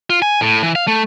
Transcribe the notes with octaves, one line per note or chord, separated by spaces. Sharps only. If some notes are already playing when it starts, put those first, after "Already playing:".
F4
G#5
A2
E3
F5
A3